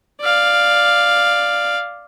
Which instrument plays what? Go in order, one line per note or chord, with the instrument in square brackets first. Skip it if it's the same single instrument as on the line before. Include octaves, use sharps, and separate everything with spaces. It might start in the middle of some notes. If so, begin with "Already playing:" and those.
[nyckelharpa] D5 F5